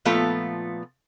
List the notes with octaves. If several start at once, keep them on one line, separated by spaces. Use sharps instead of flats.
A#2 F3 A3 B3 F4 A4